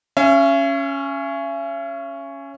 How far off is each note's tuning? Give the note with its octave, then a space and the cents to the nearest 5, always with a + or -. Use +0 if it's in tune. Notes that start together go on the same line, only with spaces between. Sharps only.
C#4 +0 E5 +45